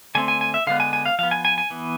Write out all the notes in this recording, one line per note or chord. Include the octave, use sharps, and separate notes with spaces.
D3 A3 C4 G#5
G#5
G#5
E5
D3 G#3 B3 F5
G#5
G#5
F5
F3 B3 F5
G#5
G#5
G#5
E3 B3